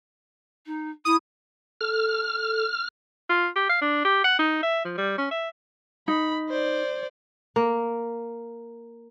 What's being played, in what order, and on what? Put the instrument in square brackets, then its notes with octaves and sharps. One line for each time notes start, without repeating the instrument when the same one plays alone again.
[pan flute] D#4
[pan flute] E4 [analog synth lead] D#6
[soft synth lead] A4 [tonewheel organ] F6
[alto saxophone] F4
G4
F5
D4
G4
F#5
D#4
E5
F3
G3
C#4
E5
[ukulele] D#4 [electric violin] B5
[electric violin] C5 D5
[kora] A#3